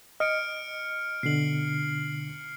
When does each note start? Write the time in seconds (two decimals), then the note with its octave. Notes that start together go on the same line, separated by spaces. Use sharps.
0.20 D#5 F6 C#7 D7
1.23 B2 D3 C7 F#7